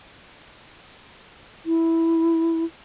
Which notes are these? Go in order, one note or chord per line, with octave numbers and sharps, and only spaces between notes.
E4